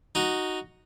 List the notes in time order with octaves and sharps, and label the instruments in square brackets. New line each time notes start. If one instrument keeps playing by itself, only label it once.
[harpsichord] D#4 F#4